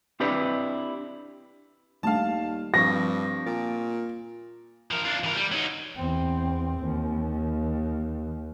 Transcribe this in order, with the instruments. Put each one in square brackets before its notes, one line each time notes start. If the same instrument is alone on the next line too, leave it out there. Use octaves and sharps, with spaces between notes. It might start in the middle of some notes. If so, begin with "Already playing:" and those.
[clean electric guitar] C4 D4 E4 G4 B4 D5
[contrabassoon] D#2 [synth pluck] G3 A3 D4 [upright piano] F5 A5
[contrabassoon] G2 [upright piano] F3 C4 C#6 [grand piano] A#6
[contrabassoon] A#2 [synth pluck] A6 D7
[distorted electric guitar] F3 A#4
D4 F4
E3 A#4
G3
F#3 D#4
[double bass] E2 C4
D#2